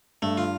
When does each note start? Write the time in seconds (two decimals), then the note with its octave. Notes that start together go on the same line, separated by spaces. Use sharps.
0.22 G2 A3
0.37 F4